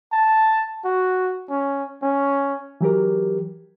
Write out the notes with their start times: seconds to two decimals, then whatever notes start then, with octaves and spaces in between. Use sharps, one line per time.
0.12 A5
0.85 F#4
1.50 C#4
2.02 C#4
2.81 E3 F#3 G4 A#4